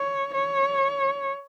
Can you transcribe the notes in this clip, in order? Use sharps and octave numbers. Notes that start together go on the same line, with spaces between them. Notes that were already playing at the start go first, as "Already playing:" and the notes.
Already playing: C#5
C#5